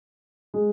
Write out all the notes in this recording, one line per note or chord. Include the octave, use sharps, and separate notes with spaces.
G#3